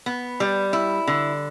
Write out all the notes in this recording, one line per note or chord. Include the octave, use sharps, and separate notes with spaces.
B3
G3
E4
D3